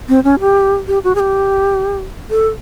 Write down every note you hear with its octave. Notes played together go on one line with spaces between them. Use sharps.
C4
C#4
G4
G4
F#4
G#4
G4
A4